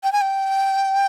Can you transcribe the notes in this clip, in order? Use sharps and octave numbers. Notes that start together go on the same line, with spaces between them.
G5
G#5
G5